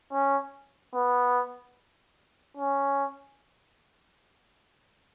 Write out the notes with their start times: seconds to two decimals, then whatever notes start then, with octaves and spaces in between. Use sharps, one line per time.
0.13 C#4
0.94 B3
2.57 C#4